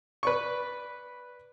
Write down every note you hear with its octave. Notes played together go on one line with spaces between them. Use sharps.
B4 D5 C#6